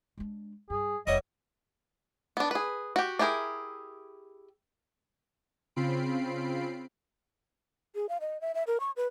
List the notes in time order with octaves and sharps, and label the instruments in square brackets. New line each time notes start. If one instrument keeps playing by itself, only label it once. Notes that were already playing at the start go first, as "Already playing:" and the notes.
[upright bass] G#3 D4
[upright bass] G2 [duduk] G#4
[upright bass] F1 [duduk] G3 [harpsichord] E4 C#5 F#5 [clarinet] D#5
[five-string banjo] B3 D4
G#4 B4
F#4 G4
D4 E4 G4 G#4 A#4
[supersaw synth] C#3 C4 F4 B5 C7 D7
[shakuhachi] G#4
F5
D#5
E5
E5
A#4
C#6
B4